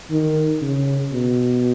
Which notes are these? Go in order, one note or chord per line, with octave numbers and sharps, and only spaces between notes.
D#3
C#3
B2